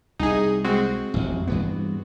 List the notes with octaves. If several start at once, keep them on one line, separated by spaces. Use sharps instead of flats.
C2 D#4 G#4
G#3 C4 F#4
A1 F2
G2 E3 B3